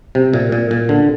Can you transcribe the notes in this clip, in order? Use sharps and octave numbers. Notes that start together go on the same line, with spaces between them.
C3
A#2
A#2
A#2
D3